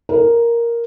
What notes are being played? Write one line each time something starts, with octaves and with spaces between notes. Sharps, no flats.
A#4